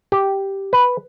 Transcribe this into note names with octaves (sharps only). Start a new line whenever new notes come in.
G4
B4